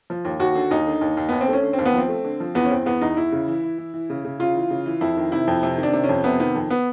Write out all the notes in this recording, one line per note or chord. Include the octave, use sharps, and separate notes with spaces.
F3
D#2
D#2 F#4
D3
D#2 D#4
D3
D#2
D#2
D#2 B3
C4
A3
C#4
D3
C4
D#2
B3
F3 C4
A3
D3
F3
E2 B3
C#4
E2 C4
E2 B3
E2 D#4
E2 E4
C#3
E3
E3
E3
E3
C#3
C#3
C#3 F4
E3
C#3
E3
F2 E4
D#3
C3 E4
F2
C3
D#3
D4
C3
C#4
F2
C3 B3
D#3 B3
F2
B3